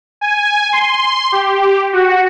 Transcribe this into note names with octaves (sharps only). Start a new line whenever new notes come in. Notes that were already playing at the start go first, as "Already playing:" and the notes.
G#5
C6
G4
F#4